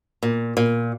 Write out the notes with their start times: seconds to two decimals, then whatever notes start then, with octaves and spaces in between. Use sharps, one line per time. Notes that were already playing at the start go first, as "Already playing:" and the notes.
0.23 A#2
0.57 A#2